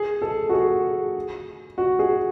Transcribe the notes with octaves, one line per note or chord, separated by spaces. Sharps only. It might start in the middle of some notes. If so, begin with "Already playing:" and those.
Already playing: G#4
A4
F#4
G#4
F#4
G#4